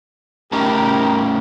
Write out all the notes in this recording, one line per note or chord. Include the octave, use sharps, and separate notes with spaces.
A2 C#3 D#4 G4 A#4